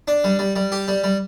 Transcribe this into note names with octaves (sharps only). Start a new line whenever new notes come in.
D4
G3
G3
G3
G4
G3
G3